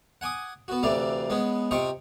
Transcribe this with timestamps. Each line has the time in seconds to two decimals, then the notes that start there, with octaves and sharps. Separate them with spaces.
0.21 F#5 G#5 D6 D#6
0.68 B3 F#4
0.83 D2 C3 E3 A3 D5 F5
1.30 G#3 B3 C#4
1.71 C3 F4 D#5 G5 C#6 D6